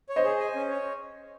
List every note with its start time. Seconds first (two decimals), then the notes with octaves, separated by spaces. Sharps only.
0.09 C#5
0.16 C5 D#5
0.24 G#4
0.40 G#5
0.55 C#4
0.70 C#5